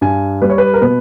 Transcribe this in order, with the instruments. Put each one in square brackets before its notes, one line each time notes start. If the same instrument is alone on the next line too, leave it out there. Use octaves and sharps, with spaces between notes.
[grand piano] G2 G#5
G3 B4
C#5
B4
A#4
B2 B4